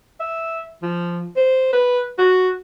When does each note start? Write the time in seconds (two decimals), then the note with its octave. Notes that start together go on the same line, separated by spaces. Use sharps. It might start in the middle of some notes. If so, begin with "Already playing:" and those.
0.20 E5
0.83 F3
1.37 C5
1.73 B4
2.19 F#4